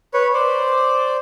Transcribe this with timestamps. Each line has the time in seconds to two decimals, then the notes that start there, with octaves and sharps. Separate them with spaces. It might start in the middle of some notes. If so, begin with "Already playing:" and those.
0.14 B4 C#5
0.33 C5 D5